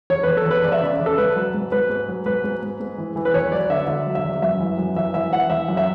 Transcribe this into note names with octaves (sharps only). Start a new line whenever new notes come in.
E2 C#5
E2 B4
A4
E2 B4
E2 D5
E5
C#3 D5
C#3
A4
G#2 B4
F#3
G#2
G#2 B4
G#2
F#3
G#2 B4
G#2
G#2
G#2
E3
E3
B4
E2 C#5
F#3 D5
D3 E5
D3 E5
F#3
E5
E2
F#2 E5
E3
F#2
E3 E5
E3 E5
E3 F#5
E3 E5
F#2
E5